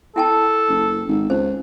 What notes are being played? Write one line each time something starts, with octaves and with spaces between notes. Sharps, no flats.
E4 A4 G5 A5
F#1
G#1
C#2 C5